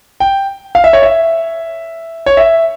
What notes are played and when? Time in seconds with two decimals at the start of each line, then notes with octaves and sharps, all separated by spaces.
0.20 G5
0.75 F5
0.84 E5
0.93 C#5
1.02 E5
2.26 C#5
2.37 E5